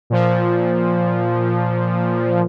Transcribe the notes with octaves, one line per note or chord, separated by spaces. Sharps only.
A#2 F3